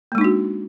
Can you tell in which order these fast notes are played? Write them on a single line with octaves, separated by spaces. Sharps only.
A#3 G#3 D#4 D4 F#4